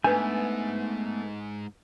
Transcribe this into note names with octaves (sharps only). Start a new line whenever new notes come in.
G#2 A3 B3 D4 B4 G#5